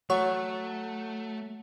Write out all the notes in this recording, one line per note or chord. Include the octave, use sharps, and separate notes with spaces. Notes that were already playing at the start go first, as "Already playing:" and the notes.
F#3 A3 C#5